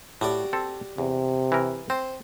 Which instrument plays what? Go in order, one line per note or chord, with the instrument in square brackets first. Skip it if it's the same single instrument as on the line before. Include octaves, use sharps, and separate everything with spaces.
[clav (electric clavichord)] A2 [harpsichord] F#4 G4 D5
[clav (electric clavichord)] C4 A4
[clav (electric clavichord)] E2 [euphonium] C3
[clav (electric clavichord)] E3 A#4
[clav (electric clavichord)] C4 [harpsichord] C5